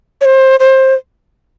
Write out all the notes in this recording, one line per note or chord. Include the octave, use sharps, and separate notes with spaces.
C#5
C5
C5